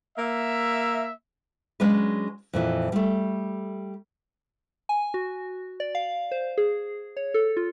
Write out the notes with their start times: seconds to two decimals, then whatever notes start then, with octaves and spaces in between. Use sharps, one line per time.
0.18 A#3 E5
1.80 F#3 G#3 C#4 D4 B4
2.53 F2 A#2 E3
2.92 G3 A3
4.89 G#5
5.14 F#4
5.80 D5
5.95 F5
6.32 C5
6.58 G#4
7.17 C#5
7.34 A4
7.57 F4